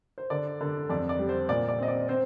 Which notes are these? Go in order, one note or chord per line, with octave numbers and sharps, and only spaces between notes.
C5
D3 D5
D3
F2 D5
D5
G3
C5
A#2 D5
D5
C4 D#5
D5
C4 C5